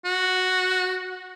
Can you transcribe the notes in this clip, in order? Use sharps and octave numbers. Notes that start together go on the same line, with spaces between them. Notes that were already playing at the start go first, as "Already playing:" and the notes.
F#4